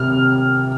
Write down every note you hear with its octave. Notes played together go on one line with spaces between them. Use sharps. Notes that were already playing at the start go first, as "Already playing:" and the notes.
Already playing: C3 F6